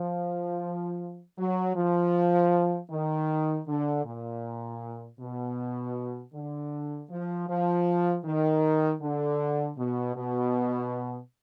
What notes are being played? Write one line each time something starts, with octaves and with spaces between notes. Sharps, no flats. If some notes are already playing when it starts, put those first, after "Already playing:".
Already playing: F3
F#3
F3
D#3
D3
A#2
B2
D3
F3
F3
D#3
D3
B2
B2